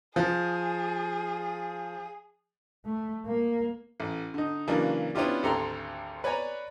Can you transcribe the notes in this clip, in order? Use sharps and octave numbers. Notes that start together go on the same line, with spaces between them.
F3 G#4
A3
A#3
A1
D3 D#4
C#3 E3 F#3 A#3 D4
B3 C#4 D4 E4 F4 G4
G#1 D2 G4 A4 A#5 C6
B4 C#5 D5 G#5 A#5